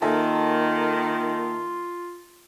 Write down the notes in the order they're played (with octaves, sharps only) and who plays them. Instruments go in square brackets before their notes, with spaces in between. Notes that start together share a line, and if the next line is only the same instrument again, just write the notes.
[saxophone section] D#3 [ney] A#3 [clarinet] F4 [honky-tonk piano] A4 E5 G#5